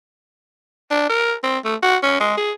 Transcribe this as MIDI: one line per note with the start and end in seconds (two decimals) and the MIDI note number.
0.90 1.09 62
1.09 1.34 70
1.43 1.58 60
1.65 1.75 57
1.83 1.97 66
2.03 2.18 61
2.20 2.32 56
2.37 2.51 68